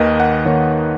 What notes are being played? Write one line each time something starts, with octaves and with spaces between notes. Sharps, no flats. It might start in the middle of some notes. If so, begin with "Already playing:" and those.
Already playing: D#2 D#3 A#3 D#4 B4 D#5
F#5
D#2 D#3 A#3 D#4 C#5